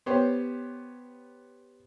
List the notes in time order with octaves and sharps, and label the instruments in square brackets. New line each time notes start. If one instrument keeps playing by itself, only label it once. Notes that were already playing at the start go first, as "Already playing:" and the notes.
[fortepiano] B3 G4 C5 C#5